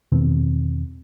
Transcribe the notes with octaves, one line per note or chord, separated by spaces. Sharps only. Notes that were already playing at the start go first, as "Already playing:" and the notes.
E2 B2 D#3 C4